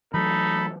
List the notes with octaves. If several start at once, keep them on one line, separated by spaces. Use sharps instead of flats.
E3 F#3 A3 D#4 A4 B5